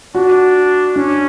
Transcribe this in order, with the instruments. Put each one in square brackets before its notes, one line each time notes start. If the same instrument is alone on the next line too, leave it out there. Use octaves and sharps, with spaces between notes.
[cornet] D4 [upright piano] F#4
[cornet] C#4 [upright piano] D4